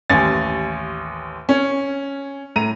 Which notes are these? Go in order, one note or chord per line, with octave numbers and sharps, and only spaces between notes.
A1 D#2 G#5 A6
C#4
A2 A#5 D#7